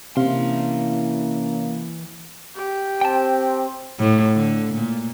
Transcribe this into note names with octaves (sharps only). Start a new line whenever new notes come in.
C3 E3 A#3 C#4 E4 F5 C6
G4
C4 G5 A5
A2
D3
A#2